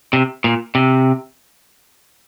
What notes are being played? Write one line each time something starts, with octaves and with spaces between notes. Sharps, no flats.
C3
A#2
C3